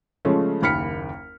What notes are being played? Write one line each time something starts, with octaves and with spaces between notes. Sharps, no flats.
C#3 F3 G#3 A3 C#4
F#1 D#2 B5 F6 B6 C#7